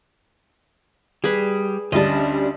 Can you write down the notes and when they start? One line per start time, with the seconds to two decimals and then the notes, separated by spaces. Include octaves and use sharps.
1.24 G3 G#4 B4
1.92 D2 G3 C#4 D4 D#5 A5